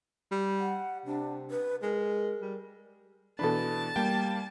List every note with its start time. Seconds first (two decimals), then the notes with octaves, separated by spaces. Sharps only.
0.32 G3
0.59 F#5
1.06 C3 D4
1.51 B4
1.83 G#3 A#4
2.41 G3
3.39 B2 E3 D4 A4 B4 A5
3.96 G3 A#3 G5